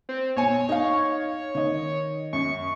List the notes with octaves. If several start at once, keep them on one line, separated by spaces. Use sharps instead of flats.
C4
B1 C#5 G#5
D#4 F5
D#3 D#5
F#2 C#6